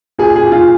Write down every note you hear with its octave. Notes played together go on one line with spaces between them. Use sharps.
A#2 G#4
G#4
A#2
F4